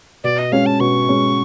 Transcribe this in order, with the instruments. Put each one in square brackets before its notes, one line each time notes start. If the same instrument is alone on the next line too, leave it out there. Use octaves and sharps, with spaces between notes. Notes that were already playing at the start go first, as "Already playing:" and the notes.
[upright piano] B2 [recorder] D5
[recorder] D#5
[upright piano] G#3 C#4 [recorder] F5
[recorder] A5
[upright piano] B2 [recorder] C#6
[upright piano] G#3 C#4